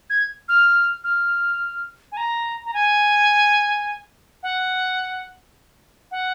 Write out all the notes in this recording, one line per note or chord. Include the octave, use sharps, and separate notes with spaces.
G#6
F6
F6
G#5
A#5
A#5
G#5
F#5
F#5